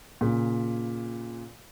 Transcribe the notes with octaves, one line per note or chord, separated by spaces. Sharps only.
A#2 C#3